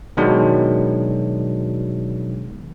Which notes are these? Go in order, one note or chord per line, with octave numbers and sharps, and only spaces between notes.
B2 D#3 F#3 G#3 D4